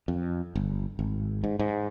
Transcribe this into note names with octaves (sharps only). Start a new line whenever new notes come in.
F2
G1
G#1
G#2
G#2